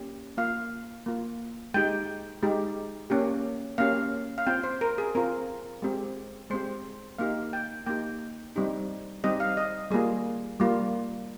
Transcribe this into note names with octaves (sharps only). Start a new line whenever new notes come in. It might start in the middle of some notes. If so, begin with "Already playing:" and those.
Already playing: A#3 C#4 G4
A#3 F4 F5
A#3 F4
G#3 D#4 G4 G5
G#3 D#4 G4
A#3 C#4 G4
A#3 C#4 G4 F5
F5
C4 F4 G5
C5
A#4
G#4
C4 F4 A#4
G#3 C4 G4
G#3 C4 G4 C5
A#3 D#4 G4 F5
G5
A#3 D#4 G4 G5
G3 C4 D#4 G4
G3 C4 D#4 G4 D#5
F5
D#5
G3 A#3 F4 G#4
G3 A#3 F4